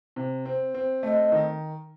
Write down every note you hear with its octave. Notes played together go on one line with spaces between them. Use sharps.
C3
C4
C4
A3 D#5
D#3